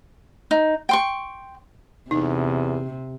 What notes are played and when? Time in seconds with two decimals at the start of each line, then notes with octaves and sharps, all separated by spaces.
0.51 D#4
0.89 G5 C6 C#6
2.11 E2 C3 D#4